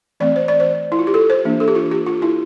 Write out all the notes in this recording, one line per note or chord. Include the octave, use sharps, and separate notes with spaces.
E3 A3 C4 D5
C5
D5
C5
E4
F4
G4
A4
C5
E3 A#3 D4
A4
G4
F4
G4
F4
E4